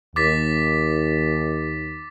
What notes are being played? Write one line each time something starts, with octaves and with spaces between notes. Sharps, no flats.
D#2 D6 A6 B6